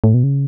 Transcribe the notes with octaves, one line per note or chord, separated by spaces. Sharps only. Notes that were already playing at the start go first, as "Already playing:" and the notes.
A2
B2
C#3